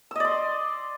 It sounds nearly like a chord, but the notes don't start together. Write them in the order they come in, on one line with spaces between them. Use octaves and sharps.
E6 D#5 D5 C6